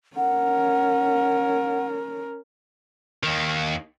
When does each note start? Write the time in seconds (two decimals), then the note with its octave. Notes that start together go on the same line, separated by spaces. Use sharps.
0.17 C#4 A#4 F#5
3.23 D#2 D#3